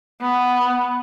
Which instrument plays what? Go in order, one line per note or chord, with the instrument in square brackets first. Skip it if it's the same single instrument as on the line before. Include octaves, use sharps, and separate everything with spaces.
[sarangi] B3